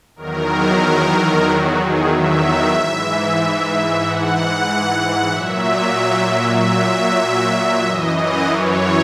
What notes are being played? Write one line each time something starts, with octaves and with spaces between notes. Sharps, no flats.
E2 D#3 F#3 A#4
F#4
G#4
E5
G#2 E3
F#5
A#2 F#3 E5
E5
F#2 E3 D#5
D#5
C#5